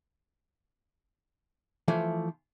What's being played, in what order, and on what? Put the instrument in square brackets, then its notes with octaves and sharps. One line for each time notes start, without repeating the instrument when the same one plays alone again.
[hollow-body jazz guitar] E3 F3 A3